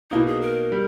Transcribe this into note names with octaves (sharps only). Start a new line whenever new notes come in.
B2 A#3 D#4 E4
G#4
A#4
G3